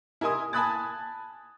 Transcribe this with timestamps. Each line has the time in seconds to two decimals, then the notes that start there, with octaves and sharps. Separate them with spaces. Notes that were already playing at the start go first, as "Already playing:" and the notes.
0.21 E4 A#4 D#5 G#5 C6 D#6
0.53 G#5 A5 B5 D#6 F#6 A6